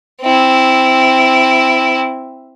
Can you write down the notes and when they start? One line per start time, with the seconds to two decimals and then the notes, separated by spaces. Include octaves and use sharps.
0.22 C4 E4